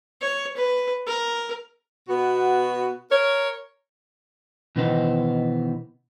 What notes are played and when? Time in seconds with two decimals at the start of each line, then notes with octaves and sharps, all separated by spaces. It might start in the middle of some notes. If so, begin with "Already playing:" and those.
0.21 C#5
0.57 B4
1.07 A#4
2.08 B2 B3 F#4
3.10 A#4 C#5
4.76 B2 D#3 E3 B3 C4 D#4